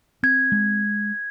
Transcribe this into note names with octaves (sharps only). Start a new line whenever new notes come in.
C4 G#6
G#3